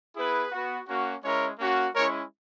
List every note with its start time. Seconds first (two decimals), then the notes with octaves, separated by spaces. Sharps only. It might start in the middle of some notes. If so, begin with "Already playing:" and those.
0.16 B3 E4 G#4 B4
0.52 B3 F#4
0.88 A#3 C#4 F#4
1.24 G#3 C#4 E4 A#4 C#5
1.59 A#3 C#4 F#4
1.95 G#3 C#4 E4 A#4 C#5